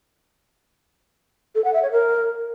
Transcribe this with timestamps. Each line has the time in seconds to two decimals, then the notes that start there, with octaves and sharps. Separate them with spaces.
1.55 A4
1.64 F#5
1.74 E5
1.83 C#5
1.92 A#4